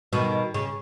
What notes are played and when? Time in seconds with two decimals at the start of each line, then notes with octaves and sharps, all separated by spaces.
0.13 B2 D#3
0.54 C#3